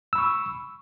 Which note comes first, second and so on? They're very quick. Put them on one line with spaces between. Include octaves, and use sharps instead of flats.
E6 B5 C#6